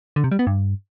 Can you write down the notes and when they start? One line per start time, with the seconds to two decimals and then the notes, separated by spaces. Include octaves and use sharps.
0.16 D3
0.24 C3
0.31 G3
0.39 B3
0.47 G2